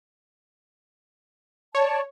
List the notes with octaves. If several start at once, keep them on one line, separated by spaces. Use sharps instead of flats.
C#5 D5 A5